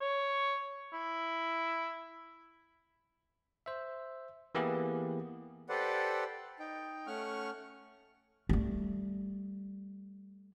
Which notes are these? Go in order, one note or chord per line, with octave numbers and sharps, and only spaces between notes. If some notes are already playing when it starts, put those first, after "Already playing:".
C#5
E4
C5 E5
E3 A#3 B3 E4 G4 G#4
G4 A4 B4 C5 D5 F#5
D#4 G5
A3 C#4 F#5 C#6 F6
G3 A3